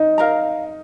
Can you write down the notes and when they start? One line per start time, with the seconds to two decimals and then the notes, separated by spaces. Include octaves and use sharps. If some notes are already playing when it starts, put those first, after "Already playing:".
Already playing: D#4
0.18 A#4 F5 A#5